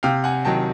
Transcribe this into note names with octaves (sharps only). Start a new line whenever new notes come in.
C3 F5 G5
F#5 G#5
D#3 F#3 G5 A5